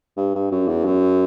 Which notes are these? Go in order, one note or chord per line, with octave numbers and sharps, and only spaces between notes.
G2
G2
F#2
E2
F#2